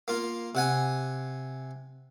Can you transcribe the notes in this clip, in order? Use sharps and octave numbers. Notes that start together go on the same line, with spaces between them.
A#3 F4
C3 F#5 G#5